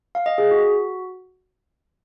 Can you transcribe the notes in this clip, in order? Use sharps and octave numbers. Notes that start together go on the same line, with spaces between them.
F5
D#5
G#4
F#4